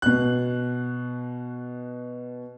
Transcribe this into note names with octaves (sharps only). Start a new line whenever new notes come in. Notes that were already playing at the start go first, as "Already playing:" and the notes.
B2 F#6